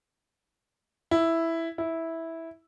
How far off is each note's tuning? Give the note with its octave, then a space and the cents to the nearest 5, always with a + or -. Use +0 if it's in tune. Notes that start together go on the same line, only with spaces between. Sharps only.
E4 +0
E4 -10